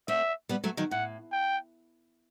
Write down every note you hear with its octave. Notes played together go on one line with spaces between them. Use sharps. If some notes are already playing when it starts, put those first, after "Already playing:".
A3 C4 E5
G3 B3
F#3 A3
D#3 F#3
A2 F#5
G5